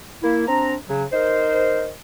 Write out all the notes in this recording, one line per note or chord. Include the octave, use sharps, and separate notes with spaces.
A#3 E4
C4 D4 A#5
C#3 F#3
D#4 A#4 C5